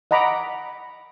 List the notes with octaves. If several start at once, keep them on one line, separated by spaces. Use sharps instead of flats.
D#5 F#5 A#5 B5 D6